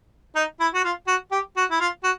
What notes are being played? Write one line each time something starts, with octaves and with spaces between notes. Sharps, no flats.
D#4
E4
F#4
F4
F#4
G4
F#4
E4
F4
F#4